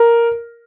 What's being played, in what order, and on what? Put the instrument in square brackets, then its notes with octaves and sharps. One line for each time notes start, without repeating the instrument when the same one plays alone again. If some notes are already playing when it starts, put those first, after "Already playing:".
Already playing: [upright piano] A#4